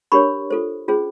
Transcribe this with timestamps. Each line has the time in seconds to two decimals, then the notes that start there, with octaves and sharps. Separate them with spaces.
0.12 D4 G4 A#4 C#5 B5 C#6
0.50 F4 A4 C5
0.88 C#4 F4 G#4 C5